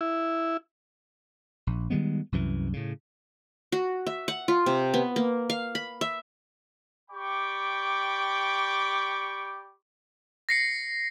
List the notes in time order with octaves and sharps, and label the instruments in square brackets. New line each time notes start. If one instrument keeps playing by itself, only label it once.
[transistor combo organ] E4
[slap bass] A#1
D#3 G3 G#3 B3
C2 F#2 E3
A2 C#3
[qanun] F#4
E5
F#5
F4
C3
B3
A#3
F5
B5
E5
[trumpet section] G4 D5 G5 B5 C#6 D6
[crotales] A#6 C7 C#7